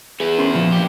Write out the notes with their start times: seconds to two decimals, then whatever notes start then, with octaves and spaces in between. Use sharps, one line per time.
0.20 B3 E4 G#4
0.38 C#4 A#4 C6
0.54 A#2 F3
0.72 D4 G4